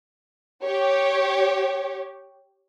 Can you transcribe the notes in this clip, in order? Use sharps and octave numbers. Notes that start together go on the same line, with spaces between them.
G4 C#5